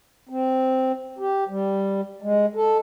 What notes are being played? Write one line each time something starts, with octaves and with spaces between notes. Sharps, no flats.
C4
G4
G3
G#3
A4